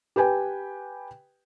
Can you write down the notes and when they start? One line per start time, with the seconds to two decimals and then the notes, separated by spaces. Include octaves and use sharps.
0.16 G4 B4 G5 G#5